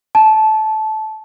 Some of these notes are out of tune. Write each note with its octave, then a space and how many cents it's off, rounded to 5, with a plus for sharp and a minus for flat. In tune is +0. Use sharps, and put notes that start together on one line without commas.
A5 -20